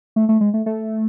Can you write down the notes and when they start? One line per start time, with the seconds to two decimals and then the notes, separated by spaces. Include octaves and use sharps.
0.16 A3
0.29 A3
0.41 G#3
0.54 A3
0.66 A3